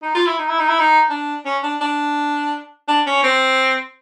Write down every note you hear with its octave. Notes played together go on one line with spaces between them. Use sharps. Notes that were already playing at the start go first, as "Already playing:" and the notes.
D#4
F4
E4
D#4
E4
D#4
E4
D#4
D4
C#4
D4
D4
D4
C#4
C4